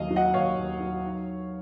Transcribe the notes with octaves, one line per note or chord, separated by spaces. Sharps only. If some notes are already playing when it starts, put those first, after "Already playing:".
Already playing: D#2 F#3 D#5 F5
F#3
D#5 F#5
D#2 C#5 F5
D#2
F#3
D#4